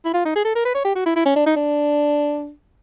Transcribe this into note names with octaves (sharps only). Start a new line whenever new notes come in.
E4
F4
D#4
G#4
A4
A#4
B4
C#5
G4
F#4
E4
E4
C#4
D4
D#4
D4